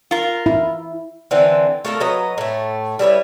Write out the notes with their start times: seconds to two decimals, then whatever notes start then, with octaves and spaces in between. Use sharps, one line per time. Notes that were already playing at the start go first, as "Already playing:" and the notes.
0.11 F4 A#4
0.46 E4
1.31 D3 E3 C4
1.85 A3 F4 A4 A#4
2.00 F#3 B4 D#5 A#5
2.38 A2 A3
2.99 G3 E4 B4 C#5